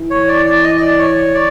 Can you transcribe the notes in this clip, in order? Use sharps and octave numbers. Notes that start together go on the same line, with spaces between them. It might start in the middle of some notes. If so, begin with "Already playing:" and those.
Already playing: E3
C#5
D5
D5
D#5
D#5
D5
C#5
D5